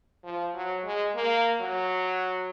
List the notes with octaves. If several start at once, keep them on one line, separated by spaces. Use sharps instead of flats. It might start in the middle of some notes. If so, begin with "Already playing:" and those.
F3
F#3
G#3
A#3
F#3